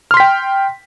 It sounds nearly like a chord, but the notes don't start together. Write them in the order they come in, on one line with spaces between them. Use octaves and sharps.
F6 C6 B6 G5